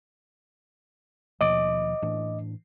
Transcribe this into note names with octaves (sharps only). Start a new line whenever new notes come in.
D#2 B2 F3 D#5 D6
A2 E3 D4